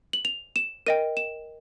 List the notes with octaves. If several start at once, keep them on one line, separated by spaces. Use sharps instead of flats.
F#7
F7
E7
A#4 D#5 G5 D#7
E7